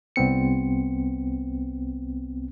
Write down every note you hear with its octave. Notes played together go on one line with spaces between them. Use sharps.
C2 B3 C4 C#7